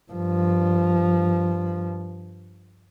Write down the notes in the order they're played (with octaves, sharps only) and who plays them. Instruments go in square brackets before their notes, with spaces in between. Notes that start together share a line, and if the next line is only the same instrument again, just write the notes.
[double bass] G2 F3